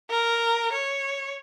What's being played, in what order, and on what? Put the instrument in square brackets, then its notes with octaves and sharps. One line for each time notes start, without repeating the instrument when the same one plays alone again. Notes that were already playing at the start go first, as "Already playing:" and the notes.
[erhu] A#4
C#5